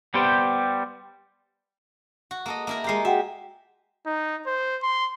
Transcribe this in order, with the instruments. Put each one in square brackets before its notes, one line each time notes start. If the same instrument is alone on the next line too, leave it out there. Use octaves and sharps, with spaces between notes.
[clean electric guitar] G3 B3 G4 C5 G5
[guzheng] F#4
A#3 A4 D#5
A#3 E4 A#4
[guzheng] G#3 F4 G4 [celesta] A#5 C7
[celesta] F#4 F#5 G5 [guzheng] E5
[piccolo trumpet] D#4
C5
C6